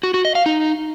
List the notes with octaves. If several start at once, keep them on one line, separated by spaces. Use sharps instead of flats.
F#4
F#4
D#5
F5
D#4